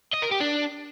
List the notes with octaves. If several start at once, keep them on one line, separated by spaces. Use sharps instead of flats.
D#5
A#4
G4
D4